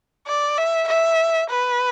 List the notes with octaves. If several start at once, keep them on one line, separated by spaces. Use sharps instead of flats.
D5
E5
E5
B4